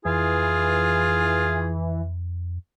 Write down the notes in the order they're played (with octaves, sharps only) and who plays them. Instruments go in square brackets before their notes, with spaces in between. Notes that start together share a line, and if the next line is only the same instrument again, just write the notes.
[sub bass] F2 [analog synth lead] E3 [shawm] F4 [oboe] G#4